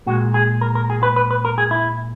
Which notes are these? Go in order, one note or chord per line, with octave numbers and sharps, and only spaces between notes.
A#2 G#3 F#4
G#4
A#4
A#4
G#4
B4
B4
B4
A#4
G#4
E4